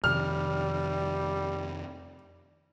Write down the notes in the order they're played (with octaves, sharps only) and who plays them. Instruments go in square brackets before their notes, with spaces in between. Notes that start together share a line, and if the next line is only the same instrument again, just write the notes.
[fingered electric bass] F2 C3 D#3 [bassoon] G3 [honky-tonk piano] F6